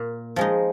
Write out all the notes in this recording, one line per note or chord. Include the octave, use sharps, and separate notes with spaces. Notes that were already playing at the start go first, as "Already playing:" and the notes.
Already playing: A#2
F3 G#3 D#4